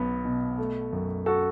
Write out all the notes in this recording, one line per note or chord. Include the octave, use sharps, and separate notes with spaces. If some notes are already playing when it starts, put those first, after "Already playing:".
Already playing: B1 B3
B2
A3
F#2
F#4 A4